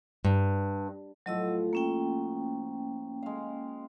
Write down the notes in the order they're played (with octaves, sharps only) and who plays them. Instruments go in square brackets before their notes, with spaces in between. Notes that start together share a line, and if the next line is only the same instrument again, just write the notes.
[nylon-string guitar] G2
[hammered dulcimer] A2 F3 F#5 [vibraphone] F#3 D#5 E6
[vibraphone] A#3 C#4 G5
[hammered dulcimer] G#3 F5